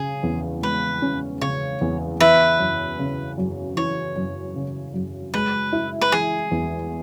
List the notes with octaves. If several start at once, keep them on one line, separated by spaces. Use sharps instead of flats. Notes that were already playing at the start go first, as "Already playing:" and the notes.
Already playing: C#3 G#4
E2
G#3 B4
C#4
C#3 C#5
E2
E3 B4 E5
F#2
C#3
F#2
E3 C#5
F#2
C#3
F#2
G#3 B4
E4
B4
E3 G#4
E2